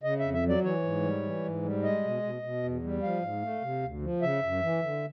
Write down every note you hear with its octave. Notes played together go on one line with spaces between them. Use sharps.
C#3 D#5
F2 E5
E5
F#3
D5
E3 C#5
G#2
G3
E3
G#2
G3
G#3 D#5
B2
B2
B2
E2
G3
F3 F5
G#2
A3
C3
D2
F3
C#3 E5
F#2
E3
D3